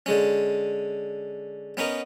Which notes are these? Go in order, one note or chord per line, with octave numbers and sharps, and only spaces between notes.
D3 G#3 C#4
B3 C#4 D#4 A#4